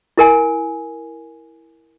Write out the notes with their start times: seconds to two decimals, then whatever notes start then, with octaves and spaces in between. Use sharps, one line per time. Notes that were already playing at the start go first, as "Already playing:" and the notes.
0.18 E4 A#4 G#5